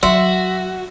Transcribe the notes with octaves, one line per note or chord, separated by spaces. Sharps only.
F#3 F4 F#4 E5 C6